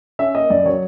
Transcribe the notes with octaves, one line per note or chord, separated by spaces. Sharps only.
C#4 E5
A#3 D#5
F#2 D5
F#3 C#5